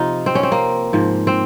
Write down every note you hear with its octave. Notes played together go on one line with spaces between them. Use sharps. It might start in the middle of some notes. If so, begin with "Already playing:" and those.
Already playing: C3 F3 D#4 F4
C4
C#4
C4
A#3
G#2 F3
C4